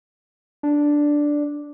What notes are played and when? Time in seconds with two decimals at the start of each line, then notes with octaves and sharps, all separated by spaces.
0.63 D4